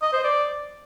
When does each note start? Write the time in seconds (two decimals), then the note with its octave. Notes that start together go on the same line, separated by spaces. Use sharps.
0.02 D#5
0.13 C5
0.24 D5